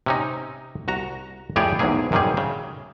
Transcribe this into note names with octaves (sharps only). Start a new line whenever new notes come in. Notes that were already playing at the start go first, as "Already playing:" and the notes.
C3 C#4 D#4
C2 F#4 A#5
F2 A2 G4 G#4 C#5 D5
B1 E2 G#2 F#3 A#3 G#4
F#2 C3 D#3 G3 G#4
C#3